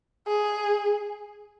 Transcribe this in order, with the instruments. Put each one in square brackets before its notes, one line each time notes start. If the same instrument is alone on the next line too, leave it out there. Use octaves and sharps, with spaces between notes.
[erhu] G#4